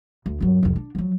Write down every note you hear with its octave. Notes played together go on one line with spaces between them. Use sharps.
D2
G2 F#3
C2 F2
D4
F3 F#3